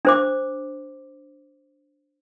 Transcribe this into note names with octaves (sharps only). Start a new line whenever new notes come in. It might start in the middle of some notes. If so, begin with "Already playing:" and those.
D4 C5 D6